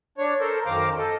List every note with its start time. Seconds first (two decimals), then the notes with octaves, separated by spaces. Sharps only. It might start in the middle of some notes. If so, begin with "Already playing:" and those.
0.18 D4 C#5
0.40 A4 A#4 C5
0.65 F#2 D#3 C5 F5 A#5 D6
0.97 A4 D#5